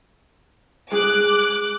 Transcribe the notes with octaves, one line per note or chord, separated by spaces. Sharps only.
G#3 G#4 D6 F#6